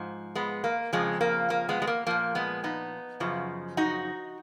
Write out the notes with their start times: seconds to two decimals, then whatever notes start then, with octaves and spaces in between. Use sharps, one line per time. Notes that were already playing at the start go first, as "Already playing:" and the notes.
Already playing: G#2 F3
0.35 G#3 B3
0.64 A#3
0.93 F2 C#3 F3 G#3
1.21 A#3
1.50 A#3
1.69 G#3 B3
1.82 G#3
1.87 A#3
2.07 A#2 F3 A#3
2.35 G#3 B3
2.64 B3 D#4
3.20 F#2 C#3 F3
3.77 D#4 F#4